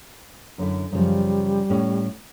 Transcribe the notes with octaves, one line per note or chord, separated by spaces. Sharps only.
F#2 D3 E4
F#2 C#3 F3 G3
A2 C#4